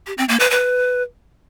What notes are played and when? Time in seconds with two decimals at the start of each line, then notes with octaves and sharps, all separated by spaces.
0.07 G4
0.18 C4
0.29 A#3
0.40 B4
0.51 B4